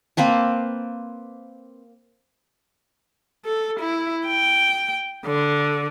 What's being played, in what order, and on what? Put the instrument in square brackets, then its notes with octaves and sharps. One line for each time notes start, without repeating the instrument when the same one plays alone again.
[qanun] A#3 C4 B4 A5
[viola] A4
E4
G5
D3